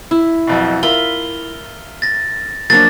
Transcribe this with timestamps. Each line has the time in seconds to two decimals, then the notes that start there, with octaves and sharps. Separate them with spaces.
0.11 E4
0.47 B1 F2 B2
0.83 F4 A#4 E5 B5 G7
2.02 A6 A#6
2.70 F3 F#3 A#3 D4 A6